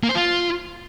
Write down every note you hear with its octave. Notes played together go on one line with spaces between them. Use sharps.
A#3
C5
F4